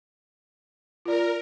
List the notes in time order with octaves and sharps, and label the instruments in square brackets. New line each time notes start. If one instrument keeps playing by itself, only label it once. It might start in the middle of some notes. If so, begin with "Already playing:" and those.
[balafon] F4 D5 [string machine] A#4